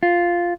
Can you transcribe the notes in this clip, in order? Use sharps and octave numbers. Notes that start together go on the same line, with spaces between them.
F4